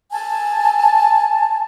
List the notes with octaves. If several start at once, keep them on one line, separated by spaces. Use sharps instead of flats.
G#5 A5